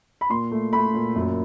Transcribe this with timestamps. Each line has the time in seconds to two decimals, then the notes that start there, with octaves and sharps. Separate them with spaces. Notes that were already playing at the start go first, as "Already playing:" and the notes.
0.21 B5
0.30 A#2 C6
0.51 A3
0.73 A3 B5
0.94 A#2
1.16 F#2